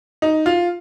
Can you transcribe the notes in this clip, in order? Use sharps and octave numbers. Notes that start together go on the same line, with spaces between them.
D#4
F4